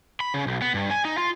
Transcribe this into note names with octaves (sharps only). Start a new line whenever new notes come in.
B5
C#3
B1
B3
G2
G#5
D#4
F4